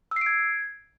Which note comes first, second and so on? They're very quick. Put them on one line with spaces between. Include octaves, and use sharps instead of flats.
E6 C7 D7 G#6